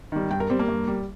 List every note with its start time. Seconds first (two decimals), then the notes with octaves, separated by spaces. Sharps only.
0.12 D#3 G3
0.31 G2 G5
0.40 A#4
0.50 G3 C4
0.59 A#3
0.68 G2
0.88 G3